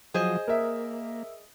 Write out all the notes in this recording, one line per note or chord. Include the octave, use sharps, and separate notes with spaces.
F3 F#3 G#4 C5 D#5
A#3 A#4 E5